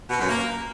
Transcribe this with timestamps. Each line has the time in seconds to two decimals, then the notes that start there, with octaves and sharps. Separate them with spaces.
0.10 B2
0.20 F#2
0.29 A#3